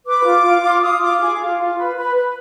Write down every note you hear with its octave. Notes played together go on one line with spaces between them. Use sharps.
B4 D6
F4
F4
F4
F4 D#6
F4 D6
G#4 D6
F4
F4
B4
B4
B4